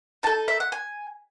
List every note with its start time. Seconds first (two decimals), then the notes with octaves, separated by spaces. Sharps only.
0.23 D#4 A4 A5
0.48 E5
0.60 F#5
0.72 G#5